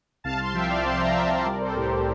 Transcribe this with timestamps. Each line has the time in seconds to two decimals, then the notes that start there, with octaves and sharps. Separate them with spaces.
0.24 C2 F5 A5
0.40 A5 C6
0.54 F3 E5 G5
0.70 D5 F5
0.85 C4 A5 C6
1.00 G5 A#5
1.15 C2 E5 G5
1.31 C5 E5
1.45 G3 A#4 D5
1.61 A4 C5
1.76 A2 G4 A#4
1.91 G4